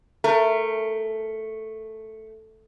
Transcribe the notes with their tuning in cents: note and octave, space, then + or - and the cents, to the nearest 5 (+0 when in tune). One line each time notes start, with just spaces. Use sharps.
A3 +0 A#4 -20